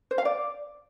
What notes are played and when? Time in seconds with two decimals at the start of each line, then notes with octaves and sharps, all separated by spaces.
0.11 C5
0.18 F5
0.25 D5